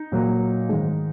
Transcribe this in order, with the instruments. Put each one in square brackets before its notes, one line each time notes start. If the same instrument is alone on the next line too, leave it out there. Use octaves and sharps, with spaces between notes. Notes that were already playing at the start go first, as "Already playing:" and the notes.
Already playing: [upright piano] D#4
A#2 F#3 A#3
G#2 D#3 G#3